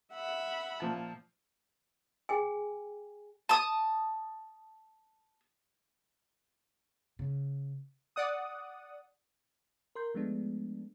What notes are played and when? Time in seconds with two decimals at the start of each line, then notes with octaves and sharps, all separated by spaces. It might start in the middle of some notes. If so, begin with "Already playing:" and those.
0.13 E5 F#5 B5
0.80 A#2 F3 A5
2.29 G#4 G5 G#5
3.49 A5 D#6
7.19 C#3
8.16 D5 F#5 D#6
9.95 A#4 C6 G6
10.14 F3 G#3 A3 B3 D4